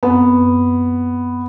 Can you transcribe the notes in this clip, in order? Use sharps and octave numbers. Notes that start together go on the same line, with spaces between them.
F#2 B3 C4